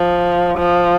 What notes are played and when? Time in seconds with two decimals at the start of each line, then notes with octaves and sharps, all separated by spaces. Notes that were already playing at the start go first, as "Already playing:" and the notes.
Already playing: F3
0.58 F3